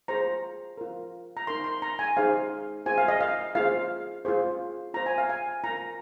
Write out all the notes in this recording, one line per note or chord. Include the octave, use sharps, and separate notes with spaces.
F4 G#4 C5 A#5
F4 A#4
A#5
D#4 A#4 C6
C6
A#5
G#5
D#4 G#4 C5 F5
F4 G#4 C5 G#5
F5
D#5
F5
F4 G#4 C5 F5
F4 G#4 C5
F4 C5 A#5
G#5
F5
G#5
F4 A#4 A#5